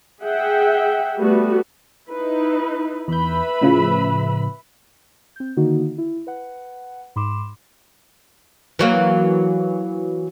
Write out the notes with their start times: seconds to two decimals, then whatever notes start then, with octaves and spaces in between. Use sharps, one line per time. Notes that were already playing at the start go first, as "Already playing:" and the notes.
0.22 G#4 E5 F#5 G5
1.18 G3 A3 B3 F#4
2.09 D#4 E4 B4
3.08 E2 B4 E5 B5 G6
3.61 A2 C#3 F3
5.36 C4 G6
5.57 D3 D#3 A#3 D#4 F#4
5.98 E4
6.27 B4 F#5
7.16 G#2 B5 C6 D6 E7
8.79 E3 F#3 A#3